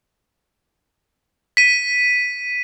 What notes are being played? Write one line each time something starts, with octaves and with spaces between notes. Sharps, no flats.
B6 D#7